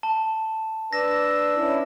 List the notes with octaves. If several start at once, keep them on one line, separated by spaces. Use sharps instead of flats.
A5
D4 B4 A5 E6 A#6
C#4 E4